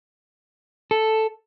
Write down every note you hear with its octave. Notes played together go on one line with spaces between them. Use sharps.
A4